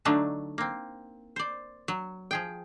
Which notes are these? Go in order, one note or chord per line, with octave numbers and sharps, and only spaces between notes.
D3 F#3 A3 D4 D#4
A#3 C4
C5 D5
F#3
F3 G#4 G5